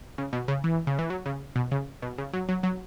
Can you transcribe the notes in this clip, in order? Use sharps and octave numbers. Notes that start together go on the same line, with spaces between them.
C#3
B2
C#3
E3
C#3
E3
F#3
C#3
B2
C#3
B2
C#3
F#3
F#3
F#3